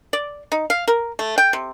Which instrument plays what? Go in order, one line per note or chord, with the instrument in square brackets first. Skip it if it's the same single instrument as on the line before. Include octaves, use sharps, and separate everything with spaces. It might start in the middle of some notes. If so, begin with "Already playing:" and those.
[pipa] D5
D#4
F5
A#4
A3
G5
C3